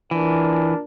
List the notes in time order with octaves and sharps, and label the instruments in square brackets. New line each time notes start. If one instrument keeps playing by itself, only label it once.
[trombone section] A#2 D4 A#4 [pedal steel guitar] E3